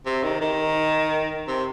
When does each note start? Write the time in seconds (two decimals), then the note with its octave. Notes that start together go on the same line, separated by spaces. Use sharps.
0.06 C3
0.24 D#3
0.41 D#3
1.48 C3